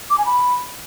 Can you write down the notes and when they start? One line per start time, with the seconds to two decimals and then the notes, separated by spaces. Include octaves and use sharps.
0.10 D6
0.18 G#5
0.26 B5